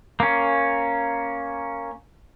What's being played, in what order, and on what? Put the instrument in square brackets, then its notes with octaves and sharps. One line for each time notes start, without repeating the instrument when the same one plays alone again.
[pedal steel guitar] A#3 C#4